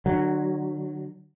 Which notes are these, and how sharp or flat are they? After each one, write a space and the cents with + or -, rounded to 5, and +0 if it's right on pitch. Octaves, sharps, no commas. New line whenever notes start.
D3 +35 F#3 +0